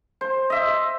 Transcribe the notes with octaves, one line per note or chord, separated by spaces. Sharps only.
C5
D#5 E5